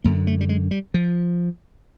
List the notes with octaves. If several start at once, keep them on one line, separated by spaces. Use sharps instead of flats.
F#2 D3 A#3
A3
G3
G#3
G3
F3